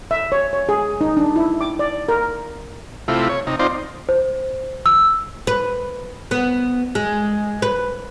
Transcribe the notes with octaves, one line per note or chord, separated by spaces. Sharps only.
E5
C#5
C#5
G#4
D#4
D4
E4
D6
D5
A#4
C3 A3 E4 F4
C#5
C3 D#4
C4 D#4 F4 C5 D5
C5
E6
B4
B3
G#3
B4